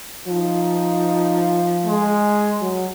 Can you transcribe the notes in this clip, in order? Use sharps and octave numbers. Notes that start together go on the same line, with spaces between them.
F3 D#4
G#3
F#3